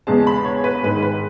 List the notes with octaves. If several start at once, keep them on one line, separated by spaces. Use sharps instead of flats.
E2 C#3 G#3 A5
B5
C#5
B4
G#2 D#3 G#3 B4
B4